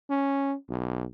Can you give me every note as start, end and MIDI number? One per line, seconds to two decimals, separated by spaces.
0.10 0.55 61
0.69 1.05 35